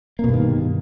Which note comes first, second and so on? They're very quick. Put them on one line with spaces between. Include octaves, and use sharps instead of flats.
A#3 B2 G2 D#3